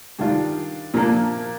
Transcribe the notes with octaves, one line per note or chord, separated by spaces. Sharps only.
G2 D#3 G3 D4 F4
A#2 F3 A#3 D4